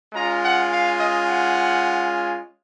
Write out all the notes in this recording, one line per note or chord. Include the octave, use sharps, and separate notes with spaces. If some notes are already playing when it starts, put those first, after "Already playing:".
G#3 C#4 F4 A#5
F#5
F5
D#5
F#5